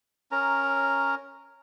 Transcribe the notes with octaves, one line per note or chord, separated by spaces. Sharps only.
C#4 A#4 A#5